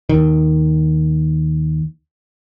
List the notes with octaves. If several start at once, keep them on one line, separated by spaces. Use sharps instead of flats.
D#2 D#3